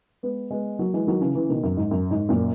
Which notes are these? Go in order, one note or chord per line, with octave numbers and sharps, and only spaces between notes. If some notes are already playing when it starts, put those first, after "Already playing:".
G#3 B3
G#3 B3
F#3 A#3
E3 G#3
D#3 F#3
C#3 E3
C#3 E3
B2 D#3
F#2
G#2
F#2
G#2
F#2 A#2